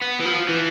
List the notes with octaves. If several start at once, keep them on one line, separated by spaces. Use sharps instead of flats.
B3
E3
F3
E3